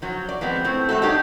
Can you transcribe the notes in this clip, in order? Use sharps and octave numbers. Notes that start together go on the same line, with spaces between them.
F3 F#3 F#4
D5
F3 G#3 B3 C4
A2 C4
G3 A3 F#4 A4
D4 D#4 F#4 G4 C#5